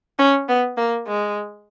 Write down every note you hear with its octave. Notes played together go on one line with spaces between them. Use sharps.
C#4
B3
A#3
G#3